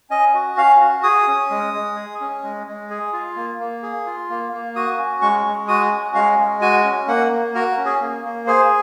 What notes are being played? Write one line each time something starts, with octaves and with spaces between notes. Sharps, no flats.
C#4 D#5
F#4
C#4 F5
F#4
G#4 D#6
C#4
G#3
G#3
G#4
C#4
G#3
G#3
G#4
F4
A#3
A#3
G#4
F4
A#3
A#3
F#4 D#6
C#4
G#3 C#6
G#3
F#4 D#6
C#4
G#3 F5
G#3
F#4 G#5
C#4
A#3 F#5
A#3
F#4 A#4
C#4
G#4
A#3
A#3
G#4 C5